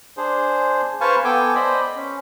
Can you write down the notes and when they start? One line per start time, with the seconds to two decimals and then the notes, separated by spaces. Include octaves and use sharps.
0.17 D4 G#4 C5
1.01 B4 C5 F5 G#5 A5 C#6
1.24 B3 A4 G5 G#5 D6
1.55 C5 D5 D#5 B5
1.96 C#4